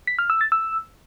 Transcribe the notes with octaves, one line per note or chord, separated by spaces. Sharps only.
B6
F6
E6
A6
E6